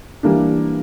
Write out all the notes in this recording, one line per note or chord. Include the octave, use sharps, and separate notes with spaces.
E3 G3 A#3 D4